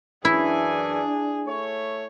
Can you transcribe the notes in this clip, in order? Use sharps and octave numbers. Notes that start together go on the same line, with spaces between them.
F#2 E3 D4 E4 G#4 G#5
A3 C#5